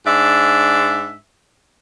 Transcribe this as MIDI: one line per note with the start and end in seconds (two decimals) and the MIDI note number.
0.06 1.16 44
0.06 1.16 62
0.06 1.16 76